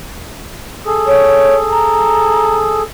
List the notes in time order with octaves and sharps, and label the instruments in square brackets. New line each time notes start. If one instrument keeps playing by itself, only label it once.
[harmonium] G#4 A4
[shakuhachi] C#5
A#5